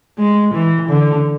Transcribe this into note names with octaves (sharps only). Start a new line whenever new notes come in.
G#3
E3
D3